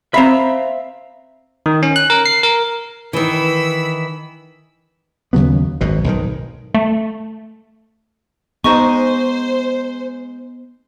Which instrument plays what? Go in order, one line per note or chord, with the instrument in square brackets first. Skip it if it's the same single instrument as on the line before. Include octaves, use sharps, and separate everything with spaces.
[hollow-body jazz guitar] C4 B5 [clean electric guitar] E5 F5 A#5
[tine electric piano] D#3
C#4
F#6
A#4
C7
A#4
[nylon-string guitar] D#3 E3 [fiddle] B5 E6
[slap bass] D#2 C#3 F#3 B3
G#1 F#2 B2
B1 G#2 D#3
[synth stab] A3
[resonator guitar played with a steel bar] G#3 D#4 A5 [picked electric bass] B3 [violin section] C5 [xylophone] C#6